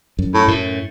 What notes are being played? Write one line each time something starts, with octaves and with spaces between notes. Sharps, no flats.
F#2
A2
F#2 A2